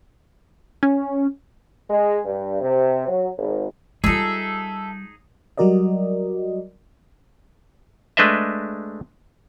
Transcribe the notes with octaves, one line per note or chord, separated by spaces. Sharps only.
C#4
G#3
G2
C3
F#3
G#1
G3 D#4 F4 G#4 A4 E5
F#3 G3 F#4 A#4 D5 D#5
G#3 A3 D4 B4 D#5 E5